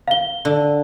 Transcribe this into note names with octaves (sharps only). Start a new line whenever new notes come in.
F5 G7
D3